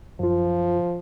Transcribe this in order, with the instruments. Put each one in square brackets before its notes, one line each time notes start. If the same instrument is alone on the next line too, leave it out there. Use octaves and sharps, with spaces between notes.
[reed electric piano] F#2 F4 [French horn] F3